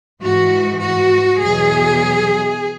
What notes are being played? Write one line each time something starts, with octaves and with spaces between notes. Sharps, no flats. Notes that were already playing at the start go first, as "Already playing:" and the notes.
G#2 E3 F#4
F#4
E2 B2 F#3 G#4